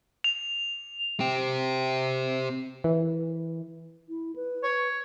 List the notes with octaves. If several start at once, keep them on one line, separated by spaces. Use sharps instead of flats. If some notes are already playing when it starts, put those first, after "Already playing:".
F7
C4 G4
E3
E4
B4
C#5